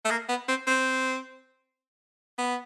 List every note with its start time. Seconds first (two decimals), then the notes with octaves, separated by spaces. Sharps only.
0.05 A3
0.11 A#3
0.29 B3
0.48 C4
0.67 C4
2.38 B3